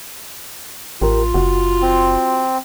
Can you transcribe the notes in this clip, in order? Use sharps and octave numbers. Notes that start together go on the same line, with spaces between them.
A1 F4 G4 A#4
F#1 F#4
C4